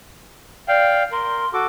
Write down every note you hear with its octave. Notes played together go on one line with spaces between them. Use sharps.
D5 F5 G5
A#4 C6
F#4 A4 D6